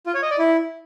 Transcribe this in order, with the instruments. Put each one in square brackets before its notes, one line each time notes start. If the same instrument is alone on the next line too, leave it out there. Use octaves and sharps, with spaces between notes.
[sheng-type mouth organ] F4
C#5
D#5
D5
E4